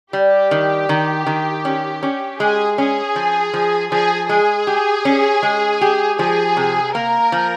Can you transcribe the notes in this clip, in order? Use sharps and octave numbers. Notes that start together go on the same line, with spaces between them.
G3 G4
D#3
D#3
D#3
C#4
C#4
G#3 G#4
C#4 G#4
F3
F3
F3 G#4
G#3 G#4
G4
C#4
G#3
G4
F3 G#4
C3
A#3 A#4
F3